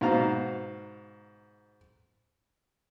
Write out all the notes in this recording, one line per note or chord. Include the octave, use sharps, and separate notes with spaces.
G#2 B2 F5 A#5